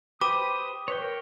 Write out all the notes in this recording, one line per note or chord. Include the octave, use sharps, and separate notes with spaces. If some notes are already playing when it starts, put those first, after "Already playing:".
G4 B4 C5 D6 D#6
B4 C#5 G5
A#4